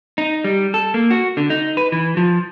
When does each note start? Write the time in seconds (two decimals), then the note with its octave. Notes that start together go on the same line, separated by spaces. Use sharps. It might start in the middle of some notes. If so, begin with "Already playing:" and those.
0.18 D#4
0.44 G3
0.74 A4
0.94 A#3
1.11 F#4
1.37 D3
1.50 D#4
1.77 B4
1.92 E3
2.17 F3